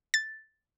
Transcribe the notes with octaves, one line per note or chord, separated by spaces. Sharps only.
A6